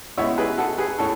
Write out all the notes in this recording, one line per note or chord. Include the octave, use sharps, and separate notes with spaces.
A2 G#3 B3 C#5 E5
G#4 B4
F#4 A4
G#4 B4
A2 A4 C#5